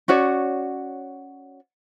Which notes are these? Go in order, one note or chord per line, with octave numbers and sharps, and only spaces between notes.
C#4 F#4 C#5 D5